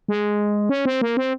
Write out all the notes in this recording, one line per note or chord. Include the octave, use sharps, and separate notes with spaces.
G#3
C#4
C4
A#3
C4